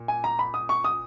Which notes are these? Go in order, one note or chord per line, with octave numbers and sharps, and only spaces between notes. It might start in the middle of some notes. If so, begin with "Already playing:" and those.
Already playing: A#2
G#5
A#5
B5
D#6
C#6
D#6